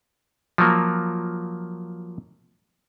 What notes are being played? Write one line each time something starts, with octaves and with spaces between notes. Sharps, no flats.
F3 F#3 A#3